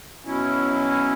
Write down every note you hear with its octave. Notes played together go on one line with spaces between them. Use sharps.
B2 F#3 C#4 E4